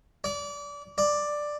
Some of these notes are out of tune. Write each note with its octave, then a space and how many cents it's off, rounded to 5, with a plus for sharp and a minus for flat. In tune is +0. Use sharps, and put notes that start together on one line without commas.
D5 -25
D5 +10